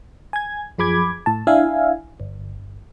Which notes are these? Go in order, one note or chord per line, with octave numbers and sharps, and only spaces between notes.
G#5 G#6
F#2 F3 G#4 B5 D6 G#6
A2 A5
D4 E4 E5 F5 G#5
G1